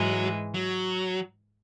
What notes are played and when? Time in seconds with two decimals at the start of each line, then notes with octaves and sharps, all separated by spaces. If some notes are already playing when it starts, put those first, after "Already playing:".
Already playing: G#2 E3 F#3 G#3
0.54 F#3